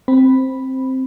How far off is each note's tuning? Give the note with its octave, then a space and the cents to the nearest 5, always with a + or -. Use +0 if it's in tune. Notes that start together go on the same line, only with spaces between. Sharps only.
C4 +0 B5 +0